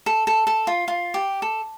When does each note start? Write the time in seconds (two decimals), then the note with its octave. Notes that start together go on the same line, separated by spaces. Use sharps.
0.06 A4
0.27 A4
0.47 A4
0.67 F4
0.88 F4
1.14 G4
1.42 A4